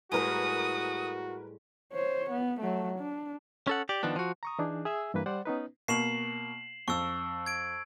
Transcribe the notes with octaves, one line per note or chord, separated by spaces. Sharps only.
A2 G3 G#3 F#4 A#4 B4 G#5 D#6
C5 C#5
B3
F#3 A3
D4
C#4 A4 F#5
G4 D5
D#3 F3 B3 D4
F3 F#4
A#5 C#6 D#6
E3 D4 D#4 G#4
G#4 E5 G#5 E6
G2 E3 A#3 B4
G3 C5 D5 F#5
B3 C#4 D#4 B4
B2 A#3 C#6 C7 E7 F#7
F2 C#6 E6
G#6 D7